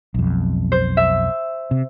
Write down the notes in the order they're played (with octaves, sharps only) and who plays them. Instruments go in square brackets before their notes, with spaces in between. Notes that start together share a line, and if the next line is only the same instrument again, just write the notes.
[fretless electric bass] B1 F2
[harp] C5
E5
[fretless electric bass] C3